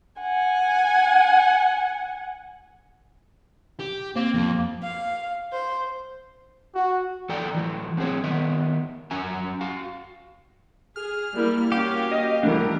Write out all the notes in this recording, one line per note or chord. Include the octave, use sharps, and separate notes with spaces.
F#5 G#5
G4
A#3 C4
F2
F5
C5
F#4
E3 F#3 A4 D5 G5 A#5
E3 F#3 A3
F#3 C4 G#4 C5 C#5
D#3 B3 D#5 E5
F#2 F#3 C#4 E5 G#5 A#5
F#4 F5
G#4 F6
G3 A#3 E4
A#3 C#4 F#4 G4 F5
D#5
E3 G3 A3 D4 A#4